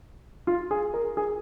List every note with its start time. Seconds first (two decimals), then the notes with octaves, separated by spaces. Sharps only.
0.47 F4
0.71 G#4
0.94 A#4
1.17 G#4